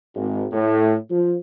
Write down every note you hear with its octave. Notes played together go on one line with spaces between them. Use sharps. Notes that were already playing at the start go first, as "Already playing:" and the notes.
G#1
A2
F3